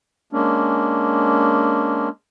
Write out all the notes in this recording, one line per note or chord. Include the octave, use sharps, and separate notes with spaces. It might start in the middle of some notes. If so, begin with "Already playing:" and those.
G#3 A#3 C#4 D4